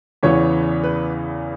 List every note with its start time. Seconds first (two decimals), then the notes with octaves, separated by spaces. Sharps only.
0.23 E2 C#3 E3 B3 C#5
0.83 B4